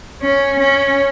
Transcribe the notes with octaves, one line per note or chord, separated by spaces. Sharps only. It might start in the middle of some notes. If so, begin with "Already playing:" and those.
C#4
C#4